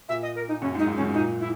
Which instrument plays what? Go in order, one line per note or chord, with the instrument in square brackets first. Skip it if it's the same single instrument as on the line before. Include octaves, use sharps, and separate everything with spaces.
[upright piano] A#2 [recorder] E5
[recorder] D#5
A#4
D#4
[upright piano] F#2 [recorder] C#4
[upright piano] G#2
[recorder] D#4
[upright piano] G#2
[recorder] C#4
[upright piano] F#2
[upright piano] A#2 [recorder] D#4
[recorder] E4